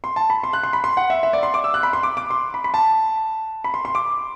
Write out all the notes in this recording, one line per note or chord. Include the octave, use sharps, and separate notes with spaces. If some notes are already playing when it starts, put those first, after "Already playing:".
C6
A5
B5
C6
F#6
C6
B5
C6
F#5
E5
E5
D5
C6
D6
E6
F#6
B5
C6
D6
D6
C6
B5
B5
A5
B5
C6
C6
D6